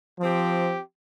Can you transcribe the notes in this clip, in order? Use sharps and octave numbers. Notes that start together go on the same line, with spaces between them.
F3 C4 G4